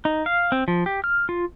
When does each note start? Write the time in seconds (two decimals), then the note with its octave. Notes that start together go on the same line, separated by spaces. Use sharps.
0.05 D#4
0.26 F5
0.52 C4
0.68 F3
0.86 G4
1.04 F6
1.29 F4